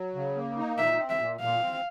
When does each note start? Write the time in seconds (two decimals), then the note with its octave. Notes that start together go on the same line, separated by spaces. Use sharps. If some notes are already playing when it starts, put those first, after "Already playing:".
Already playing: F#3
0.15 C#3
0.36 A#3
0.57 D#4
0.78 A#2 E5
0.99 C4
1.10 E5
1.19 A#2
1.40 A#2 F5
1.61 C4